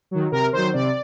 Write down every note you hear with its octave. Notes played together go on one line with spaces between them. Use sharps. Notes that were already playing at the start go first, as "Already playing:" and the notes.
D#3 F#3
C3 A#4
D#3 F#3 C5
C3 D5